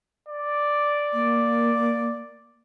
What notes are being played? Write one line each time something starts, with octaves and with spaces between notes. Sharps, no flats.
D5
A#3